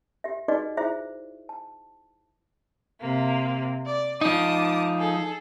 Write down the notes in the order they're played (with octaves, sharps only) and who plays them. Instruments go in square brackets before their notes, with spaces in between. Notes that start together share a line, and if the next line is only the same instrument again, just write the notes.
[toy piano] G4 E5
D#4 F#4 G#4 B4 D5 D#5
E4 F4 G#4 C5 E5
A5
[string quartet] C3 A#3
D5
[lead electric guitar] F3 D#4 [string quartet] A5 D6 D#6
[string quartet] G#4 A4